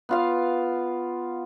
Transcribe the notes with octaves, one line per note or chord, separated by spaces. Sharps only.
B3 F4 F5